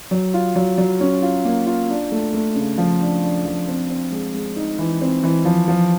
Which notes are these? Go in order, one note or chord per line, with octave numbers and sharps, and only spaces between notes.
F#3
F4
F#3
F#3
C#4
F4
A#3
F4
D4
A3
A3
C#3
F3
D4
D4
F3
C4
C4
G#3
G#3
D#4
E3
C4
E3
F3
F3